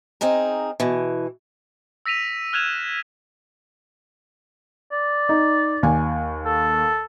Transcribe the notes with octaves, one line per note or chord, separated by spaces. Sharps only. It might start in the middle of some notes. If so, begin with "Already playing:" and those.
C4 D#4 G#4 A#4
B2 E3
E6 A#6 B6 D#7 F7
F6 F#6 G#6 E7 F7
D5
D#4
D#2 G#5
A4